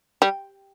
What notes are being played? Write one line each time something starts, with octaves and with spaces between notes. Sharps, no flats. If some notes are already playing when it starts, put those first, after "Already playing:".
G3